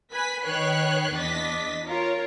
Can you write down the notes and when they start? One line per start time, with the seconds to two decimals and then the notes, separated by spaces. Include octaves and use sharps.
0.11 B4 G#5 B6
0.45 D#3 B4 C#5 G5 F#6 C7
1.14 E2 B3 D4 D#5 A6 B6
1.86 F4 A#4 C#5